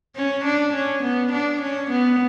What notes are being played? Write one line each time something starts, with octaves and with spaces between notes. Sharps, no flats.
C#4
D4
C#4
B3
D4
C#4
B3